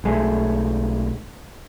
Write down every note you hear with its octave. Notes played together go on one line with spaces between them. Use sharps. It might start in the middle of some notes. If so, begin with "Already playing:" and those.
B1 G#3 A3